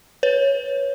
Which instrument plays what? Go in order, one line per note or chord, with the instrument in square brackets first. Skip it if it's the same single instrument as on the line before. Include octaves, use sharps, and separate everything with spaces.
[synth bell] B4 C#5